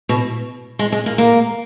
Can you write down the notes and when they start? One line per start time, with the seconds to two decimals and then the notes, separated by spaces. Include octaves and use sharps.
0.09 B2
0.79 G#3
0.92 G#3
1.06 A#3
1.18 A#3